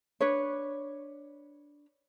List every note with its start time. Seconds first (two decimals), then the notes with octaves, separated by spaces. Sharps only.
0.20 D4 B4 C#5